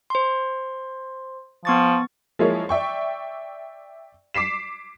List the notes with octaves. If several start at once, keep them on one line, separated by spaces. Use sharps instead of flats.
C5 C6
F3 B3 C#6 A6
F3 G#3 A#3 E4 C#5
D5 E5 G5 C#6
D6 B6 C7 E7